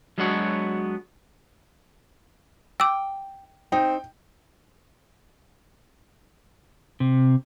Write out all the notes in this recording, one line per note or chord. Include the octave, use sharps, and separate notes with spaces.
F#3 G#3 B3 D4 F#4 C#5
G5 D6 E6
C4 D#4 G5
C3